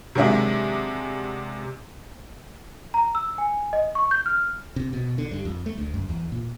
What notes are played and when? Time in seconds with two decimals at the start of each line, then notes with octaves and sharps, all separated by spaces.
0.15 C3 D#3 F#3 G#3 D4 E5
2.94 A#5
3.15 E6
3.38 G#5
3.73 D#5
3.95 C#6
4.11 G6
4.26 F6
4.76 C3
4.93 B2
5.18 D3
5.31 G2
5.45 F2
5.66 A3
5.78 D2
5.94 F#2
6.09 E2
6.32 A#2